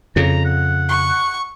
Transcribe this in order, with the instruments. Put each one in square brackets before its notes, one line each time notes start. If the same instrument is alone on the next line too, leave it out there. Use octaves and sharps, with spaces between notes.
[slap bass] F2 C#3 [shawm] A#5
[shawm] F#5
[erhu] C#6